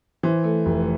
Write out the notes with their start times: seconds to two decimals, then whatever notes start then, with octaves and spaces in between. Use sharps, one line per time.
0.23 E3 C5
0.44 A3
0.66 F1